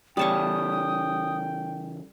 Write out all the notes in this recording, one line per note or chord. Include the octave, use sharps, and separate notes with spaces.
C#3 E3 G3 C#5 G5 A5 C#6 D#6